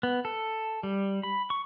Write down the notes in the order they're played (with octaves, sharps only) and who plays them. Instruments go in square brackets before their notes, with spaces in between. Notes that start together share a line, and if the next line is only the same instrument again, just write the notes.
[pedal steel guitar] B3
A4
G3
B5
C#6